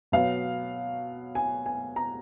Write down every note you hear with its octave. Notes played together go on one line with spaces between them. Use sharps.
B2 F#3 B3 F5
G#5
G#5
A#5